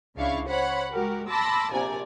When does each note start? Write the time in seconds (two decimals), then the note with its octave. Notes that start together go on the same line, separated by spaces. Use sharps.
0.16 C#2 C#3 D4 E4 F5 C#6
0.48 C5 C#5 F#5 B5
0.92 G#3 F#4 G4 A#4
1.28 A5 B5 C6 D6 E6 A#6
1.72 A#1 C3 C4 D5 G#5 A#5